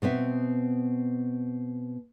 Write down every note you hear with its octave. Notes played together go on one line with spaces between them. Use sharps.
B2 B3 C4 E5